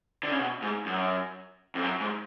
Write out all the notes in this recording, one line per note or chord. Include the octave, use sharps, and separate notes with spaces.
D3
C#3
B2
G#2
F#2
F2
F#2
G#2